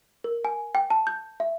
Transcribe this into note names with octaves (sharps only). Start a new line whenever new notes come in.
A#4
G#5
G5
A5
G6
E5